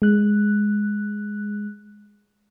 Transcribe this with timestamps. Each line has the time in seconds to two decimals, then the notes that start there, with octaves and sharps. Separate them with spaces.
0.02 G#3 F#6